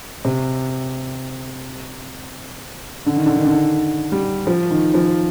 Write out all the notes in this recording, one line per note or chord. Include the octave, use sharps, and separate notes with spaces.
C3
D3
D#3
D3
D#3
D3
G3
F3
D#3
F3